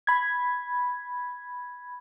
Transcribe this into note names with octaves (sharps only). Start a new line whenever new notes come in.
B5 G#6